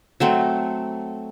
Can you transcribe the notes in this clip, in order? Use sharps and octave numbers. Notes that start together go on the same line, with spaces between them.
F#3 A3 C4